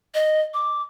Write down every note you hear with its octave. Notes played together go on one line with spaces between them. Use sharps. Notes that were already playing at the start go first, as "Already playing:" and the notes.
D#5
D6